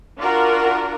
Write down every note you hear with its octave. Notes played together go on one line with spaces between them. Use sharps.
D4 F4 F#4 A#4